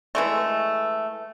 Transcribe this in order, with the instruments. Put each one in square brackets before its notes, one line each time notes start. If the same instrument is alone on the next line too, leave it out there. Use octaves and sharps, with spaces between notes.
[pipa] E3 G#3 A3